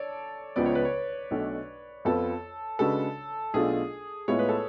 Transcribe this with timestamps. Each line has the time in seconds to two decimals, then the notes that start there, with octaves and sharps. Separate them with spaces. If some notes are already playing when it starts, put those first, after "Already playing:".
Already playing: A4 C#5 D5
0.56 C#2 C#3 F3 B3 D5
0.66 C#5
0.75 B4
0.85 C#5
1.31 B1 B2 A3 D4
2.05 F2 F3 B3 F4 A4 B4
2.79 C#3 G#3 D4 F#4 A4 B4
3.54 B1 B2 A3 D4 F4 G#4
4.28 A2 G#3 B3 F4 C#5
4.39 B4
4.49 A4